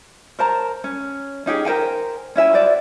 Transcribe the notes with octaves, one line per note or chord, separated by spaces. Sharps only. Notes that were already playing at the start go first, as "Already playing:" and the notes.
A#4 C5 A5 A#5
C#4
C#4 D#4 G4 G#4
A#4 C5 G5 G#5
C#4 E4 E5 G#5
F#4 C5 D5 E5